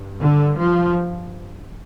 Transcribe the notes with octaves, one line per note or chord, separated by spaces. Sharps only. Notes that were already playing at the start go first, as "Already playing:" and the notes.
Already playing: G2
D3
F3